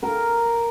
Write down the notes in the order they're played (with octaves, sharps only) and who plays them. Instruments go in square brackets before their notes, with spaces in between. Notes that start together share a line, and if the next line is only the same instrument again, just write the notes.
[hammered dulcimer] A#4